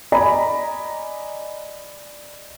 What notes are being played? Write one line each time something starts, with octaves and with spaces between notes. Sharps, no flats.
D5 D#5 G#5 A#5 B5